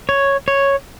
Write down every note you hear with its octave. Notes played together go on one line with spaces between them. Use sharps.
C#5
C#5